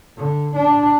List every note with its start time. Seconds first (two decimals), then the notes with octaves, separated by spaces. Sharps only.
0.17 D3
0.56 D4